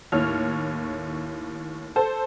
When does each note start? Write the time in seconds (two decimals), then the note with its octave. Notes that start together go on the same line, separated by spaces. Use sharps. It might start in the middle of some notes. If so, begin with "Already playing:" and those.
0.12 D#2 A2 C#5 F6
1.96 A4 C5 A5